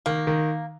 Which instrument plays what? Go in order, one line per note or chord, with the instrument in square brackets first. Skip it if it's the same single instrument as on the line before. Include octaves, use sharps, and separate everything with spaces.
[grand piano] D#3 [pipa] A#3
[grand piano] D#3